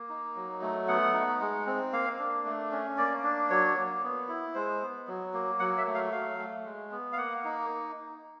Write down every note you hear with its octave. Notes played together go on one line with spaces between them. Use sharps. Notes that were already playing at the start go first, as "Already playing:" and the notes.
Already playing: A#3
D#4
F#3
A3
B3 F#5
D#4
G#3
C4
A#3 F5
D4
A3
C#4
A#3 D5
D4
F#3 C#5
A#3
B3
E4
G#3 C5
B3
F#3
A#3
F#3 F#5
E5
A3
F5
F#3 F5
A3
G#3
B3
F5
A#3 F#5
D#4